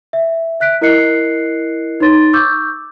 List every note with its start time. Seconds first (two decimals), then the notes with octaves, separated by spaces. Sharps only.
0.13 E5
0.60 E5 F#6 B6 D7
0.81 E4 A#4 D#5 F#6 C7 C#7
2.00 D#4 B4 C#5 C6 A6
2.33 C#6 D6 E6 G6